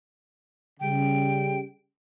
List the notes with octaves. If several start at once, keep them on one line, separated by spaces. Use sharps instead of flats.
C#3 G3 G5